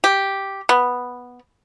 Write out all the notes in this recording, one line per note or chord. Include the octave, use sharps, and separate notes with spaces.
G4
B3